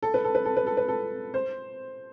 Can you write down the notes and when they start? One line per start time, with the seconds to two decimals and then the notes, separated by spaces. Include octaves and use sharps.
0.02 A4
0.14 B4
0.24 A4
0.35 B4
0.45 A4
0.57 B4
0.67 A4
0.77 B4
0.88 A4
1.34 C5